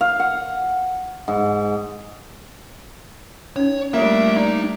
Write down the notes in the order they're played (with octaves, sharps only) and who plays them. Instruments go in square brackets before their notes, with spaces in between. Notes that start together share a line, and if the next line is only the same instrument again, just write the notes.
[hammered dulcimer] F5
F#5
G#2
[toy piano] C#4 D#4 [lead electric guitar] C#5
[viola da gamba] G3 A3 D4 [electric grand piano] A#3 [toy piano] F4 A4 A#4 [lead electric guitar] E5
[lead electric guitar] D#4 [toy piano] D5